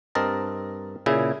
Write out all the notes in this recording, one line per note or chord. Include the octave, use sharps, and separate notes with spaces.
G2 C4 A#4 D#5 A5
A#2 C#3 E4 G#4